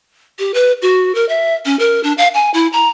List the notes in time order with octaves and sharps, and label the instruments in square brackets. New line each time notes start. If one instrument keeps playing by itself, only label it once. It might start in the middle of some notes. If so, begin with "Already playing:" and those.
[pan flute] G4
B4
F#4
A#4
E5
C#4
A#4
D4
F5
G#5
E4
A#5